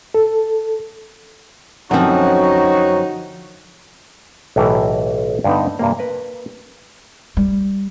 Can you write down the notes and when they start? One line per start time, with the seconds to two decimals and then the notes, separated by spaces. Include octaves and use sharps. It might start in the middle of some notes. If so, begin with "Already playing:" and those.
0.14 A4
1.91 F#2 D3 F3 C4 D#4 F#4 C#5
4.56 B1 A2 E3 G4 A#4
5.44 G2 D3 B3 D#4
5.79 G2 C3 A#3
5.99 A#4 B4
7.37 G3